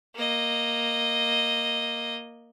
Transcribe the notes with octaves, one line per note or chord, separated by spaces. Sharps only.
A#3 D#5